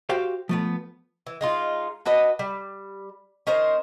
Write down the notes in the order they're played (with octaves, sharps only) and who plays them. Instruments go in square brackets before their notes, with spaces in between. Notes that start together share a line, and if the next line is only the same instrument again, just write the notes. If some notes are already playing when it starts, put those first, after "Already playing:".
[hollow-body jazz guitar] F#4 G4 C5 F5 G5
F3 A3 B3
[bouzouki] E3
G#3 D#4 F4
D4 F#4 B4 D#5
G3
C#4 D#4 A#4 C5